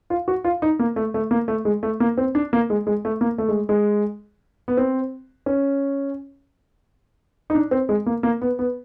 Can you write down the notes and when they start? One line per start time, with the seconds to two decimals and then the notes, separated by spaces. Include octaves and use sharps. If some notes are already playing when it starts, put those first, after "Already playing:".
0.10 F4
0.28 F#4
0.44 F4
0.62 D#4
0.79 A#3
0.96 A3
1.14 A3
1.31 A#3
1.48 A3
1.65 G#3
1.83 A3
2.00 A#3
2.18 C4
2.35 D4
2.53 A#3
2.70 G#3
2.87 G#3
3.05 A3
3.21 A#3
3.38 A3
3.49 G#3
3.69 G#3
4.68 B3
4.77 C4
5.46 C#4
7.50 D#4
7.55 D4
7.71 C4
7.89 G#3
8.06 A#3
8.23 A#3
8.42 B3
8.59 B3